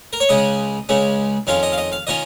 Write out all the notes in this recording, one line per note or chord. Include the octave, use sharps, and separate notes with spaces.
A#4
C#5
C#2 C#3 G#3 C#4 D#5
C#2 C#3 G#3 C#4
F2 D#3 C#4 F4 F5
D#5
F5
D#5
F5
D#3 C#4 F4 D#5